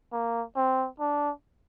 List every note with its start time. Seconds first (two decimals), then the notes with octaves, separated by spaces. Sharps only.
0.12 A#3
0.56 C4
1.00 D4